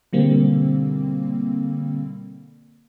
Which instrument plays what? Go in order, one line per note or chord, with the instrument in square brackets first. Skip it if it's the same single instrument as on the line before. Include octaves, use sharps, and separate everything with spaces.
[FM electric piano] B2 D3 G3 A#3 C4